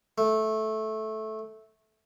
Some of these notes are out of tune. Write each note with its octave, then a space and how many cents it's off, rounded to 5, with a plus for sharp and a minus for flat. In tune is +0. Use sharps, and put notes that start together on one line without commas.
A3 -10